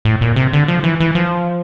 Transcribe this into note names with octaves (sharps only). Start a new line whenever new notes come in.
A2
A#2
C3
D3
F3
E3
E3
F3